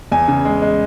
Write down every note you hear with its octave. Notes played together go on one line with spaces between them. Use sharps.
E2 G#5
C#3
G#3
G#3